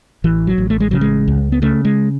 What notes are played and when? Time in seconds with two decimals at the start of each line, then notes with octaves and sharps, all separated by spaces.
0.24 A1 E3
0.47 F#3
0.58 A1
0.70 A3
0.80 G#3
0.91 C#3 F#3
1.01 G#3
1.28 C#2
1.52 B3
1.62 C#3 A3
1.85 G#3